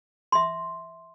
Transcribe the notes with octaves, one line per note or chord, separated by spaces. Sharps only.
E5 C6